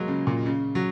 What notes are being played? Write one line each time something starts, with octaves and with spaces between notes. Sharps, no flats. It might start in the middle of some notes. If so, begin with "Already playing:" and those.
Already playing: F#3 G#3 A#3
C#3
A#2
C#3
F#3